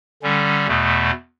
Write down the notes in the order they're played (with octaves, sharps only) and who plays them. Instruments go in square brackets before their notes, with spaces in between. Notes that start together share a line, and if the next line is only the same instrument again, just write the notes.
[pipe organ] D3 G3 C#4
E2 B2 A3